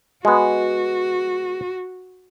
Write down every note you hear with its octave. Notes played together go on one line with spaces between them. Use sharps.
G#3 B3 F#4